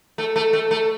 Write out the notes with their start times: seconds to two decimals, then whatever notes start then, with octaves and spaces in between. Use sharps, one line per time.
0.18 A3
0.36 A3
0.53 A3
0.71 A3